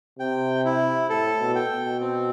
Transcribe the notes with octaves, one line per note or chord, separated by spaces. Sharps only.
C3 G5
E4
A2 A4
B2
G5
B2
C4